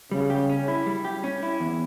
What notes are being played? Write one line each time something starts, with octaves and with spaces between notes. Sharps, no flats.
C#3 G3
G4
C#4
E4
G3
G4
C#4
E4
E2